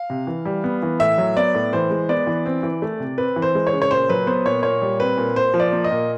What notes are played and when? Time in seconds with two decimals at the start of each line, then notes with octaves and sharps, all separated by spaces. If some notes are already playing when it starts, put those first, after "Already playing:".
Already playing: F5
0.10 C3
0.27 E3
0.45 G3
0.64 B3
0.83 E3
1.00 A2 E5
1.18 F#3
1.37 B3 D5
1.54 A2
1.73 E3 C5
1.91 G#3
2.09 B3 D5
2.27 E3
2.45 C4
2.63 E3
2.82 A3
3.00 C3
3.18 C4 B4
3.36 E3
3.42 C5
3.55 G#3
3.67 C#5
3.73 C#3
3.82 C#5
3.91 A#2 C5
4.09 F#3 B4
4.27 B3 C5
4.45 A#2 C#5
4.63 A#2 C#5
4.82 G3
5.00 C4 B4
5.17 A#2
5.36 A#2 C5
5.54 F3
5.60 D5
5.73 A#3
5.84 D#5
5.91 A#2